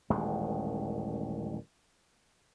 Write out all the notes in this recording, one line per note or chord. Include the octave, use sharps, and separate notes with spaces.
D#1 A1 D#2 G#3